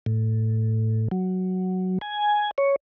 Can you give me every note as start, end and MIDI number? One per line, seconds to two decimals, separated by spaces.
0.06 1.08 45
1.11 1.98 54
2.01 2.51 80
2.58 2.76 73